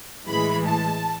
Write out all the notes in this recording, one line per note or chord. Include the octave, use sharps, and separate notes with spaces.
A2 E3 G#3 B5
A5